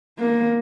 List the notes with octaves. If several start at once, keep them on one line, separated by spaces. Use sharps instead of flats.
A#3